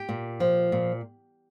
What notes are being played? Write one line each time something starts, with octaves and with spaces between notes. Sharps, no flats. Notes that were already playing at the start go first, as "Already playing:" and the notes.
Already playing: G4
A#2
F3
A#2